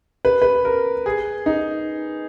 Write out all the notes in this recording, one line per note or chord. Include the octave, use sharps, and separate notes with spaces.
B4
B4
A#4
G#4
D#4